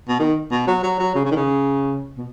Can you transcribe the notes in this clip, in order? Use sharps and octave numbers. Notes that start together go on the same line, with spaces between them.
B2
D#3
B2
F#3
F#3
F#3
C#3
C#3
D#3
C#3
B2